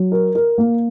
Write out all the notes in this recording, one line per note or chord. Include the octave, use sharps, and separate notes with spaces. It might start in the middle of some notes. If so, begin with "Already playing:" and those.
Already playing: F#3
A#4
A#4
A#3